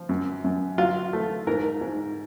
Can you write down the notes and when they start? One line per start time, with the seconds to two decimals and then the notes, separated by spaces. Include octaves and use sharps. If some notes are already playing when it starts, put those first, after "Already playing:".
Already playing: F3
0.09 F#2
0.44 F#2
0.78 F#3 F4
1.13 A3
1.47 G#2 A#4
1.81 G#2